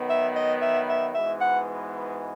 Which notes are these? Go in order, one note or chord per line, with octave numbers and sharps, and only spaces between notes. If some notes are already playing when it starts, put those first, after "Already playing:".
Already playing: D#3 F#3 B3
E5
D#5
E5
E5
G#2 E3 G#3 B3 F#4 E5
F#5